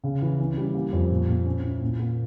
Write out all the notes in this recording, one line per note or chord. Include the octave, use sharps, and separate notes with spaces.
C#3
E3
C#4
G3
A#3
F2
A#2
A#2
C#4
E4
A#2
A#3